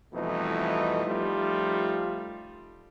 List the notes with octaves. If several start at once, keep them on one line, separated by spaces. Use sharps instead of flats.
F2 B2 E3 G3 A3 D#4
F3 G3 A3 D#4 F4